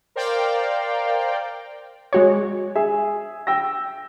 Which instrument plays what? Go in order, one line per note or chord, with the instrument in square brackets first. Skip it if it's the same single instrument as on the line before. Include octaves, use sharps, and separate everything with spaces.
[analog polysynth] A#4 C5 D5 F5 G5
[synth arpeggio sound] G#3 F#4 C#5
[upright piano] G#4 E5
G5 E6 A#6